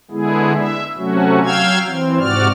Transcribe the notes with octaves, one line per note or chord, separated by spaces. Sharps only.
D3 G#3 B3 E4 G#4
E5
C3 F#3 A3 C#4 F#4
F#3 F5 G5 E6 F6 G#6
E3 C4
G#2 C3 F#4 D5 F6